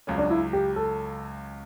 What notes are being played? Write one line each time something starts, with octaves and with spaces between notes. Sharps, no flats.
C#2 C#3 F#3 C#4
D4
E4
G4
A4